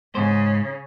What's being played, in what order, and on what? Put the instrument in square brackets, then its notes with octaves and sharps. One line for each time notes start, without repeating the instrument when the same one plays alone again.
[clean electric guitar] G#2 C5 [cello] C#3